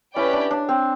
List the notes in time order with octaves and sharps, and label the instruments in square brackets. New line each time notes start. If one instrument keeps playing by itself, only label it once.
[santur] C#4 [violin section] E4 G4 B4 D5 G5
[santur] D4
D4
C4